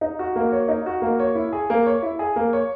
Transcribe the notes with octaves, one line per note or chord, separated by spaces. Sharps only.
D#4
F#4
A#3
C#5
D#4
F#4
A#3
C#5
E4
G#4
A#3
C#5
E4
G#4
A#3
C#5